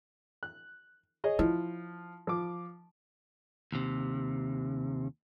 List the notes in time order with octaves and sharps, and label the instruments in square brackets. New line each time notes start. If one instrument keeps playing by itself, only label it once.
[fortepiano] F#6
G#4 C#5 D#5
[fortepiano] F3 [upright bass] E4
[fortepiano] F3 D6
[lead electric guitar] D#2 C3